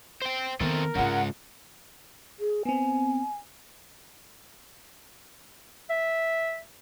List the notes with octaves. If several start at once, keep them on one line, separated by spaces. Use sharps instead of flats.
C5 G5
D#3 A3 B3 C4 A4 A#4
G#2 C#3 G#3 F4 F#5
G#4
B3 C4 G#5
E5